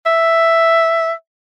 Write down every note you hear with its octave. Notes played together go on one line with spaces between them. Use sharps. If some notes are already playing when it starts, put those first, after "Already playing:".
E5